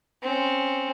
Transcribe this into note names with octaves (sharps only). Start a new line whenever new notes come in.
C4 C#4